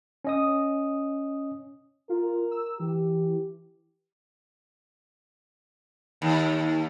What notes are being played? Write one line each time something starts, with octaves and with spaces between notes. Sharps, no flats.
C#4 D#5 D#6
F4 A#4
E6
E3 G4
D#2